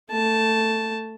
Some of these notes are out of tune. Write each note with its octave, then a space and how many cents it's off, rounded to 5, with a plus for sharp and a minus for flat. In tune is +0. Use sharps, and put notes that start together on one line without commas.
A3 +15 A5 +0